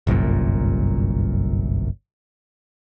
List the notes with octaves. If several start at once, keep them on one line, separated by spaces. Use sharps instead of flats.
G1 C2 F#2 A#2